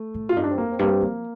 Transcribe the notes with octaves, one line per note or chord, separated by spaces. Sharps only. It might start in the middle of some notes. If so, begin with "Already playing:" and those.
Already playing: A3
A2
F4
G2 D#4
D4
C4
F2 A#3
C4
G2 A#3
C4
F3 A#3